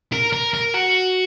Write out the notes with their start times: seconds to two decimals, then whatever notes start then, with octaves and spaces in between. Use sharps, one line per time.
0.13 A#4
0.33 A#4
0.53 A#4
0.74 F#4